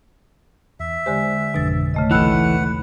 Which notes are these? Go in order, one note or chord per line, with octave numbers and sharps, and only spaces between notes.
E2 E5
D3 G#3 G4 C5
G#1 F2 B2 D3 A6
C#3 A3 D#5
A#1 D#2 E3 A3 B4 F#5 E6